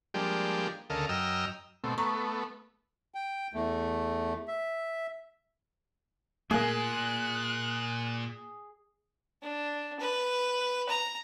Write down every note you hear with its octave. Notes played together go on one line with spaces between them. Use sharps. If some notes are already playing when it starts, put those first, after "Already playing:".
F3 G3 G#3 A#3 D4 G4
D2 C#3 A4 A#4 D#5 F5
F#2 D#5 G5 A#5 E6 F6
B2 A3 C4
A3 B3 A#5 C#6
G5
E2 A3
E5
A#2 A3 A#3 G#4 G#5 F#6
D4
B4
A#5